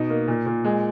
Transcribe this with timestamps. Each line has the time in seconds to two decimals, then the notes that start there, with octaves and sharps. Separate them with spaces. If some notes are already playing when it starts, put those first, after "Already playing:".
Already playing: B2 D#4
0.10 A#3
0.28 A#2
0.46 A#2
0.64 G#3